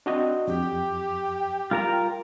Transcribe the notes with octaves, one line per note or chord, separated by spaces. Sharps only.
C4 D4 F#4 D#5
F2 G4 G5
G3 F4 A#4 A#5